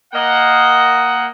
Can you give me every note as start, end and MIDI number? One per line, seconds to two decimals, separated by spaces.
0.13 1.28 58
0.13 1.28 75
0.13 1.28 78